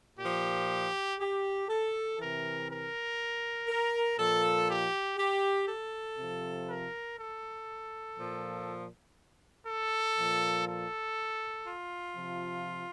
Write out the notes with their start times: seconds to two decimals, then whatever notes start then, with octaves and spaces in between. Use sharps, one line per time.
0.19 A#2 F3 G4
1.19 G4
1.68 A4
2.19 C3 E3 A#4
2.69 A#4
3.68 A#4
4.18 A#2 F3 A4
4.68 G4
5.18 G4
5.68 A4
6.18 C3 F3
6.67 A#4
7.17 A4
8.17 A#2 F3
9.66 A4
10.17 A#2 F3
10.67 A4
11.66 F4
12.16 C3 F3